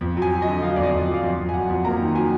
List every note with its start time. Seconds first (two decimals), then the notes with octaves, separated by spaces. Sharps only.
0.01 F2
0.17 F#3
0.22 G#5
0.32 F#3
0.42 D#5
0.47 D3
0.62 F#3 F5
0.70 D#5
0.76 F2 D5
0.83 D#5
0.93 F2
1.08 F#3
1.14 F5
1.23 F2 D#5
1.39 F2
1.49 G#5
1.54 F#3 F#5
1.69 F2
1.85 A#3 A#5
2.00 D#3
2.15 F#3 G#5